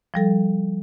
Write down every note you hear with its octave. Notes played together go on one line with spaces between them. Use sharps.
F3 G3 A4